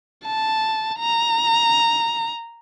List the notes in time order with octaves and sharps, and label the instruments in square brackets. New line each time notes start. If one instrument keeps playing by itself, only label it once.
[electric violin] A5
A#5